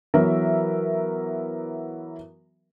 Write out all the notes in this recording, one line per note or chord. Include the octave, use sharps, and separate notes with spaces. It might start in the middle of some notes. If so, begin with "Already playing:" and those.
E3 F#3 B3 A#4 E5